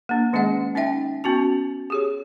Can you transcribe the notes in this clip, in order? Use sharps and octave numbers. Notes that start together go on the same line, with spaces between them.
A#3 D4
D#3 G#3 C#4 G#4 D#5 F#5
C#4 D#4 D#5 E5 G5
B3 C#4 F#4 A5
G4 G#4 C#5